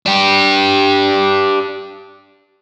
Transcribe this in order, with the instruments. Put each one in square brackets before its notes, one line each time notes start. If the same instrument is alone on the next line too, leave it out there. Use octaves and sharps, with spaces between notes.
[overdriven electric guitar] D4 G4